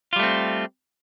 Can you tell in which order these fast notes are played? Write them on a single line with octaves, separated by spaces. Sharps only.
F4 G3 A3 C4